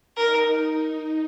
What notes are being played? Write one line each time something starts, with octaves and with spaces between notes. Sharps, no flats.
D#4 A#4